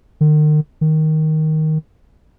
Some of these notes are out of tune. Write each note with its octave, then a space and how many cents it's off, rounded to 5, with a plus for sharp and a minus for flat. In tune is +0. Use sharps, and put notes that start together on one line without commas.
D#3 -40
D#3 +5